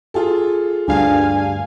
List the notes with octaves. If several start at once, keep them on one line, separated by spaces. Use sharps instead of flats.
F4 G#4 A4
D2 G2 D4 F5 G#5